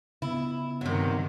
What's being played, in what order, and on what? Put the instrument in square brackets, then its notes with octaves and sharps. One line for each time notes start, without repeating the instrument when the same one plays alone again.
[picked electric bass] C#3 B3 [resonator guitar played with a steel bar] E4
[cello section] G2 D#3 [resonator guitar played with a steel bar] C3 F#3